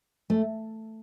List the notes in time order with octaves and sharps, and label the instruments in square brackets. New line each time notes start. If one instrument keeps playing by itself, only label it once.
[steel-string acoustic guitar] A3